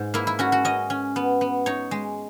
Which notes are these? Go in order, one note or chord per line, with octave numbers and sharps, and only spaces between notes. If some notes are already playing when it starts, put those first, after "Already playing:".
Already playing: G#2
A#3 E4
E4
C#4 F#4
F#4
C#4 D#5
C#4
B3
B3
D#4 C#5
G#3